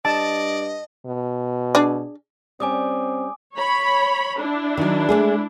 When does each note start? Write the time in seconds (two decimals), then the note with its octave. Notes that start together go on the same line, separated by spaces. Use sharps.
0.05 G2 D5 D#5 A5
1.06 B2
1.75 D4 G#4 D5
2.60 G3 C4 C#4 G#5 D6 D#6
3.56 C#5 B5
4.39 D4 E4
4.77 D#3 F#3
5.09 G#3 A3 G#4